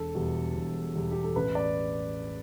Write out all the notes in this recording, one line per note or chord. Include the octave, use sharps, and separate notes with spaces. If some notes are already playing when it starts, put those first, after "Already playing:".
Already playing: E1 A4
E2 B2 G3
E1
E2 B2 G3
G4
A4
A1 B4
D5